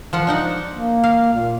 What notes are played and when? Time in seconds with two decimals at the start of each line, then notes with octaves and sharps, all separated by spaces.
0.13 F3 F4 F#5
0.27 D4 D#4 F#5
0.73 A#3
1.04 F5
1.33 A#2